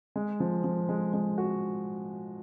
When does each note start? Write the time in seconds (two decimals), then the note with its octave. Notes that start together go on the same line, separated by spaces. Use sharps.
0.16 G#3
0.40 F3
0.64 F3
0.89 G#3
1.13 G#3
1.38 F#4